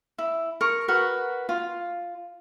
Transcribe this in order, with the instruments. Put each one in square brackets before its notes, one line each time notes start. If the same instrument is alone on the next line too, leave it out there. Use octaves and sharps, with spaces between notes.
[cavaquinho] E4
A#4 C#6
F#4 A#4 B4
F4